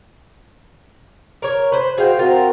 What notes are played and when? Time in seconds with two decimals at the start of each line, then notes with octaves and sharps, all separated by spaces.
1.42 A#4 C#5
1.72 B4 C5
1.98 F#4 G#4 C5 F5 G5
2.19 C4 F4 F#4 A#4